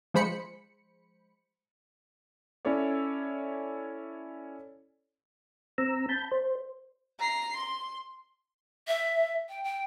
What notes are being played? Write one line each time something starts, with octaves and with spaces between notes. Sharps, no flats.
F3 G#3 C5 B5 C#7
C#4 E4 A4 C#5 D5
C4 A#5 E6
A5 B5 G6
C5
A#5 C7
C6
E5
G5
G5